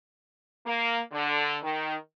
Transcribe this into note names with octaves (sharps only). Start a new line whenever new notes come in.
A#3
D3
D#3